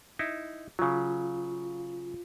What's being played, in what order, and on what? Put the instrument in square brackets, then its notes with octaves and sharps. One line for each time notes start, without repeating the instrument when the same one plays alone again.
[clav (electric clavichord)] D#4 E4
[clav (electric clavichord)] C#3 F#3 [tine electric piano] F4